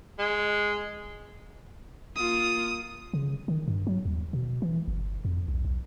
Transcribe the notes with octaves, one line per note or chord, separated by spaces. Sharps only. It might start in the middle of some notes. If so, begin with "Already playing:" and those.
G#3
A#3 F4 D#6
C#3
D#3
G2
F#3
D#2
B2
E3
G1
F2
B1
B1